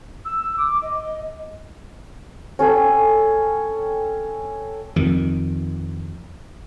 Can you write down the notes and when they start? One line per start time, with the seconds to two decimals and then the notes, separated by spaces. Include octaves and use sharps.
0.25 E6
0.57 D6
0.82 D#5
2.59 C#4 A4 G5
4.96 F2 D#3